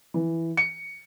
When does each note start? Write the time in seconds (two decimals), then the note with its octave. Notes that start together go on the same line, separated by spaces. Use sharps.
0.14 E3
0.57 C#7